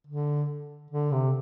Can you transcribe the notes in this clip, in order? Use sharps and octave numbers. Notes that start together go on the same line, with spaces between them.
D3
D3
C3